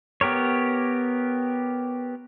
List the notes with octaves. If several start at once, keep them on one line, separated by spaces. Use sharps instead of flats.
B3 G4 A#4 C#5